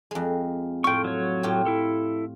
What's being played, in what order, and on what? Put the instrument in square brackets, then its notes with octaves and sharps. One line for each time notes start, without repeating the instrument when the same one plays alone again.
[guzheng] F2 G#3
[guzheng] A2 F4 [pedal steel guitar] G5 C#6
[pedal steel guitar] F#3 C#5
[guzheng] A2 F4 G4
[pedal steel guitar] E4 A4